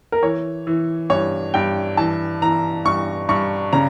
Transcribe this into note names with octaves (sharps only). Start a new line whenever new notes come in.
A#4
E3 C#5
E3
G2 C#5
G2 G5
E3 A5
E3 A#5
G2 C#6
G2 C#6
C#3 A#5